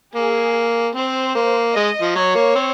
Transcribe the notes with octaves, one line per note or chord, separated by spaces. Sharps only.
A#3 G#4
C4 C5
A#3
G#3 D#5
F3
F#3 C#5
A#3
C4